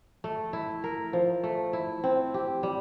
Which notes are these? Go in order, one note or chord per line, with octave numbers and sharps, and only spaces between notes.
A3
E4
A#4
F3
A3
E4
C4
G4
G3